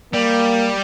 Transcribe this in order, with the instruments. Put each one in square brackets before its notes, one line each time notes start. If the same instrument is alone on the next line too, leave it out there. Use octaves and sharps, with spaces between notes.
[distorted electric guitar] G3 [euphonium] A#3